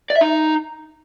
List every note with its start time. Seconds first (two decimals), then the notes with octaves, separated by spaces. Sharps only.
0.10 D5
0.16 E5
0.21 D#4